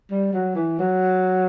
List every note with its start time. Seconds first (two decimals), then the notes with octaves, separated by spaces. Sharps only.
0.11 G3
0.33 F#3
0.55 E3
0.79 F#3